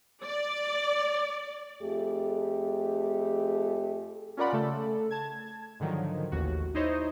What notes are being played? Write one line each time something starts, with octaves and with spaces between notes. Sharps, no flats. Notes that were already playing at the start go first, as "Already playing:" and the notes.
D5
F2 A3 G4 G#4
C#4 F4 A#4 D5 F#5 B5
C#3 A3 A4
A5 G#6
G#2 D3 D#3 F3 F#3
A1 D#2 F#4
D#4 E4 C5 C#5 D#5